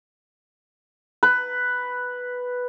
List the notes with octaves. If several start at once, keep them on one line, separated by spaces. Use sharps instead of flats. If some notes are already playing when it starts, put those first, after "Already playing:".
B4